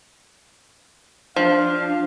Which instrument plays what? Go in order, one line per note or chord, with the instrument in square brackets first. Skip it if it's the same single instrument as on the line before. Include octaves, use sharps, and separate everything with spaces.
[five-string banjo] F3 [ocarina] D4 [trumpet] F5